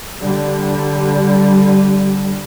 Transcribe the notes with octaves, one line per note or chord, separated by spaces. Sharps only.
D3 G3